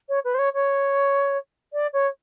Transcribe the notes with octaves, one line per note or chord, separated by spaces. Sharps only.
C#5
B4
C5
C#5
C#5
D5
C#5